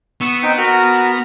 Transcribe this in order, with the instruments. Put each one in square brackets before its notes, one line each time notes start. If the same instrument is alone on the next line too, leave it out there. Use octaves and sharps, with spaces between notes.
[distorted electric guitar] B3 [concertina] C#6 E6
[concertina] C4 D#4 G5
F#4 A#4 F6